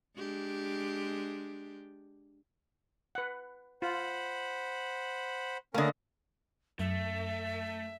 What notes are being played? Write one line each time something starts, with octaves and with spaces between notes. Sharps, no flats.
G#3 D4 G4
B4 F#5
F4 C5 F#5 B5
D3 A3 A#3 C#4 A#4 D#5
F#2 A3 E5